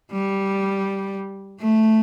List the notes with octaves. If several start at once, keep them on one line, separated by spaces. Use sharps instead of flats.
G3
A3